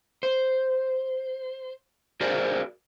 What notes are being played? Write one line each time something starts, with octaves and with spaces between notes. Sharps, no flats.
C5
F#4 G#4 A#4 C5 D5